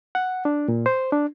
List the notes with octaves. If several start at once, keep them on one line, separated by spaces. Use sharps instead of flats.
F#5
D4
A#2
C5
D4